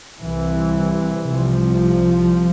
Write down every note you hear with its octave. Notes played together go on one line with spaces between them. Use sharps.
C2 C3 E3
C2 C3 F3